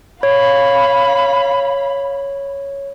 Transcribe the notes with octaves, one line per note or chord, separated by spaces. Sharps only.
C#5 F5 B5